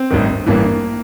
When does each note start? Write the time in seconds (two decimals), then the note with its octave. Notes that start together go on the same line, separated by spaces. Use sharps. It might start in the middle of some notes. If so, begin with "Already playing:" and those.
Already playing: C4
0.10 A1 G2 D#3
0.46 A1 G2 E3 A#3